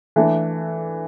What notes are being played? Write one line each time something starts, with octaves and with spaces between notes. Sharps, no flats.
E3 A3 D4